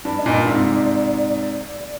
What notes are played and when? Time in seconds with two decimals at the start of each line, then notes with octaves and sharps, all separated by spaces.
0.05 G2 D5
0.19 D#5
0.26 G2 A#2
0.32 D5
0.47 G#2 C3